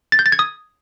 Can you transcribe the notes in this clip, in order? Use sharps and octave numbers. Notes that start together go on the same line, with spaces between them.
A6
G6
A6
G#6
D#6